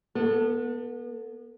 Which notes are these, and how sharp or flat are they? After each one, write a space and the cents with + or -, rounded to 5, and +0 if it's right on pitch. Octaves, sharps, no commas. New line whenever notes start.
B3 -30 A4 +20